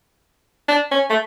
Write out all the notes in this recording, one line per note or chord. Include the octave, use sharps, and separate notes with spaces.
D4
C#4
A3